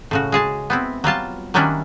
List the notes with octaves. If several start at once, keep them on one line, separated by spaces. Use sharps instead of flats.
A2 C#3 F#4
G#3 G#4 A5
B3 C4 E4
F#3 G3 F4 A5
D#3 F#3 G3 C#4 D4 E4